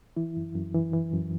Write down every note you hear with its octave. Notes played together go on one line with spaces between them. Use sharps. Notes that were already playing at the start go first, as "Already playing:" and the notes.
E3 E4
F#2
F#2
E3
E3
F#2